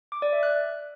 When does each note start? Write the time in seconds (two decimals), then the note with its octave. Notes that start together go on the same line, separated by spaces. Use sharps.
0.12 D6
0.22 D5
0.33 E5
0.43 F#6